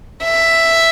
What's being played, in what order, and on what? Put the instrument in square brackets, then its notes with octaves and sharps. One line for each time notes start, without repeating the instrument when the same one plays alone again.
[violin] E5